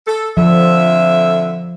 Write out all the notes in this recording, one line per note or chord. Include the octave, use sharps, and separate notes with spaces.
A4
F2 D3 F3 E5